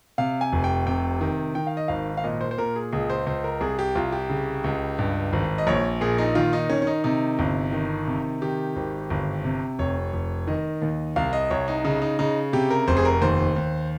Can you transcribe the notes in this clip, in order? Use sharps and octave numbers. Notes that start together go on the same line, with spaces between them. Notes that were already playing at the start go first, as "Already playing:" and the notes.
C3 F5
G#5
F1
G5
C3 G5
D#3
D#3 G5
F5
D#5
G#1 F5
F5
A#2 D#5
C5
C5
A#2 A#4
G#4
C#2 G#4
C5
C#2 C5
A#4
C2 G#4
G4
C2 F4
G4
C#3
C#2
G2
G#1
D#5
A#1 C#5
A#2 G#4
D#4
D#3 F4
D#4
D#3 C#4
C#4
D#4
C3 D#4
G1
D#3
C3
D#3 G4
G#1
G1
C3
F1 C#5
F1
D#3 D#5
D#2
C2 F5
D#5
C2 C#5
D#4
C#3 D#4
D#4
C#3 D#4
C3 G4
A#4
F1 C5
G#4
A#4
D#2 C5
D#2